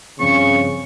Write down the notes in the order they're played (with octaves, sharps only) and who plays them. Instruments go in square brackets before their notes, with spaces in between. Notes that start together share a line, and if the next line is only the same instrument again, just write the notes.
[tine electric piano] G2 F3 C4 [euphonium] C#3 [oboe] C#6